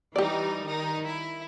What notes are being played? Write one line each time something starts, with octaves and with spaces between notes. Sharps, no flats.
E3 G3 D#4 G4 D5
D#3 D#4
E4